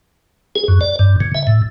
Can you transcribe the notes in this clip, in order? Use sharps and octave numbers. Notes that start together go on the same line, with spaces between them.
G#4
F#2
D5
G2
C#3
E5
A2